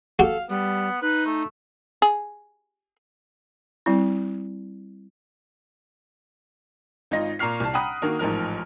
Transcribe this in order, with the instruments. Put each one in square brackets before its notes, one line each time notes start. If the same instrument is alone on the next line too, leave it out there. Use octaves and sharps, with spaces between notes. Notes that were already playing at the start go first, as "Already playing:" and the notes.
[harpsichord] F#4 G4 [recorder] A4 [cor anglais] F5
[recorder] G3 [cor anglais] B3
[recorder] D#4 [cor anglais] B4
[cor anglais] A3
[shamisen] G#4
[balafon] G3 C4 E4
[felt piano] G#1 D#4 F4 D#5 A#6
A#2 A#5 C#6 F6 C7
C2 A5
F#5 G5 A#5 B5 D#6 F#6
D#3 A#3 F#4 A#4
A1 G#2 F3 A#4 F6